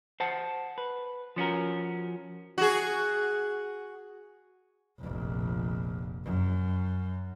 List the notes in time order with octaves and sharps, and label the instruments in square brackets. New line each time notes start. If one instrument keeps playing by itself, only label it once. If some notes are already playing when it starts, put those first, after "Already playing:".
[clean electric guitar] C5 F#5 A5
B4
F3 C#4 F#4 A#4
[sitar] F#4 G#4
[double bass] F1 A#1
F#2